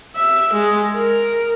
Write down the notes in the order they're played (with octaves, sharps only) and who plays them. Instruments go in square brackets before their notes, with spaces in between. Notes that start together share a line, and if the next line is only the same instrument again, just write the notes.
[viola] E5
G#3
A#4